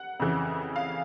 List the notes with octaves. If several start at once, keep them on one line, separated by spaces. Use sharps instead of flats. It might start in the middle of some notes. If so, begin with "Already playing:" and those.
Already playing: F#5
F2 C#3 E3
F5